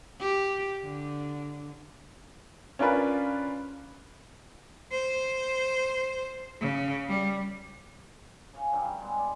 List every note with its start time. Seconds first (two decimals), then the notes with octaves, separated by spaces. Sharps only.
0.20 G4
0.83 D3
2.79 C#4 D4 F4 A#4 B4
4.92 C5
6.60 C#3
7.08 G3
8.53 C#3 F5
8.72 G2 F#3 G3
9.01 B2 G#3
9.18 D5